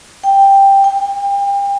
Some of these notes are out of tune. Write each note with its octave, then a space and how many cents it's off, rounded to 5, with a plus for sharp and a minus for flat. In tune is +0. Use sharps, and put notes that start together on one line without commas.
G5 +5
G5 +35